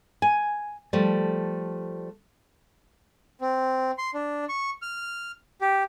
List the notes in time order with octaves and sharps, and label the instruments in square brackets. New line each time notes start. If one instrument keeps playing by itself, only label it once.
[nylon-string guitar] G#5
F3 G3 A3
[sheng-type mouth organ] C4
C6
D4
C#6
F6
G4